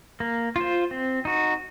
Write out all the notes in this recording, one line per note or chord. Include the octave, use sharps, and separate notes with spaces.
A#3
F4 C5
C4
D#4 F#4